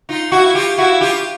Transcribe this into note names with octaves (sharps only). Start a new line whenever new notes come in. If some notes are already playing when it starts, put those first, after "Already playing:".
D#4 F4
E4 F#4
F4 G4
E4 F#4
F4 G4